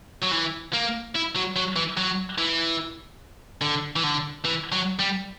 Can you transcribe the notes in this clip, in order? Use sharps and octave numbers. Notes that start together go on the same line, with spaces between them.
F#3
E3
A#3
E4
F#3
F#3
E3
F#3
E3
D3
E3
D3
E3
F#3
G3